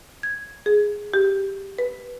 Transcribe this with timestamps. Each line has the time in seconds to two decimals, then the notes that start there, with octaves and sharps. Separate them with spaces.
0.23 G#6
0.66 G#4
1.14 G4
1.79 B4